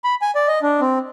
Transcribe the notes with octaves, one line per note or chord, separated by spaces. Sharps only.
B5
G#5
D5
D#5
D4
C4